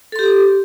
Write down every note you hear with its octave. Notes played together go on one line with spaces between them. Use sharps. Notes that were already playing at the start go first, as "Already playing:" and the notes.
G4 A4 C6